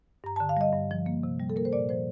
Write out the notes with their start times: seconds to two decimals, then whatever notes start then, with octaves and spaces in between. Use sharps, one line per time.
0.24 G2 A#5
0.36 A5
0.40 D3
0.49 F5
0.57 G3 D#5
0.73 G2
0.91 F3
1.06 A#3
1.23 C3
1.40 G3
1.50 A4
1.56 A#3 A#4
1.65 C5
1.72 A#2 D5
1.89 F3 C5